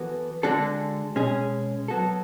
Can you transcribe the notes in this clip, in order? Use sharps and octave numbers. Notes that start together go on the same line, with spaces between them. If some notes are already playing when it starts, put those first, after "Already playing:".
Already playing: E3 B3 F#4 A4
D3 G#3 D4 F#4 A4
B2 G#3 C#4 G#4
F#3 B3 F#4 A4